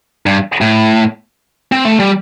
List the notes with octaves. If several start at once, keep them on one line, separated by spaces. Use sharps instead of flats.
G2
A2
C4
A3
G3